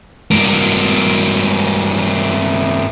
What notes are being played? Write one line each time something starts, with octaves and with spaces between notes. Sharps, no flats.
G2 A#3